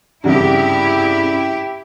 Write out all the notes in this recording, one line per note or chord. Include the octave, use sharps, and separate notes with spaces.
C2 G2 C#3 E4 G4